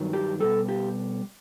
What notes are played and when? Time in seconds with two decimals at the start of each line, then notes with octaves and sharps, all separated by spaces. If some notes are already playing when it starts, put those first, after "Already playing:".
Already playing: G2 D#3 F#3
0.13 G4
0.40 B2 G3 A4
0.69 G4